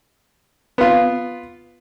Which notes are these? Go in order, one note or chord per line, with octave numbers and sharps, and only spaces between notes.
B3 F4